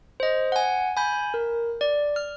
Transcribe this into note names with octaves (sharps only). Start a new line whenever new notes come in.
C5 D#5
F#5 G#5
G#5 B5 G6
A#4
D5
F6